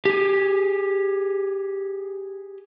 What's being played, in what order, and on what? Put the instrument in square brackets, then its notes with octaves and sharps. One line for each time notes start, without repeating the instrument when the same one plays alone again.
[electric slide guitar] G4 G#4